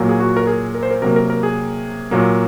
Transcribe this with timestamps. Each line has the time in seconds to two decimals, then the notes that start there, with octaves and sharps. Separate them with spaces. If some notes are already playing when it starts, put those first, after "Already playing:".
Already playing: A#2 F#3 A#3
0.09 G#4
0.20 F#4
0.37 A#4
0.47 G#4
0.75 A#4
0.83 C5
0.91 A#4
1.02 C3 F#3 A#3 A#4
1.16 A#4
1.30 A#4
1.43 G#4
2.11 A#2 F#3 A#3